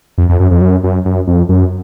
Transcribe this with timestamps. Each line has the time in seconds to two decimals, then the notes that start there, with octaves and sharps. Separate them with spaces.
0.18 F2
0.29 F2
0.40 F#2
0.51 F2
0.61 F#2
0.83 F#2
1.05 F#2
1.27 F2
1.49 F#2